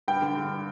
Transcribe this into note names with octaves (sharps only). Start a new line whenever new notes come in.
G2 G5
D3
G2